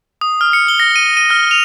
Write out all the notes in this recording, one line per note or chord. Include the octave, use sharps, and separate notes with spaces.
D#6
F6
C#7
G7
A#6
D#7
D#7
F6
F7